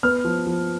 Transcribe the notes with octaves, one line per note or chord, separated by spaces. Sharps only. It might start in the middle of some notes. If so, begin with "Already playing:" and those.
B3 F6
F3
F3